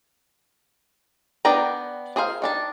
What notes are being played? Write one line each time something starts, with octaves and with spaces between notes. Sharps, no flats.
B3 D4 B4 G5 A#5
D4 G#4 A#4 C5 F5
D#3 D4 A5